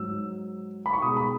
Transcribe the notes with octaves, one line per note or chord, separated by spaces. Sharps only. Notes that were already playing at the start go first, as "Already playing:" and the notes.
Already playing: G#2 F#3 E6
B5
C#6
B2 G#3 D#6
B5